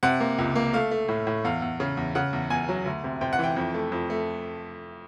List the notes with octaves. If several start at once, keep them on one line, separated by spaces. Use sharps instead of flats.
C3 F#5
A#3
C#2
A#3
A3 F5
A3
A2
A2
E2 F5
E2
C#3
E2
C#3 F#5
E2
E2 G#5
F#3
D2
C3
C3 G5
F#5
E3 G5
F2
A3
F2
A3